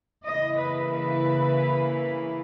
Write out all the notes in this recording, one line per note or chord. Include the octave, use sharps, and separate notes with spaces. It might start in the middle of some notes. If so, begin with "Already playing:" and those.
C#3 E3 A#3 E4 D#5
B4
B4